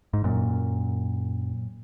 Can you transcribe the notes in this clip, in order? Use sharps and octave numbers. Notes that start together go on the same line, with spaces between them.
G#2
F#2 A#2